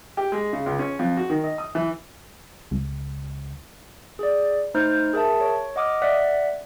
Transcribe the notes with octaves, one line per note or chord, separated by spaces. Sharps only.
G4
G#3
C#3
C#2
C#4
F2
F#4
D#3
D#5
D#6
E3
C#2
G#4 D5
A3 D#4 C5 F6 G6
G#4 A#4 E5 A5
C#5
D#5 F#5 D6 D#6 F6
D5 E5 F#5 F#6 B6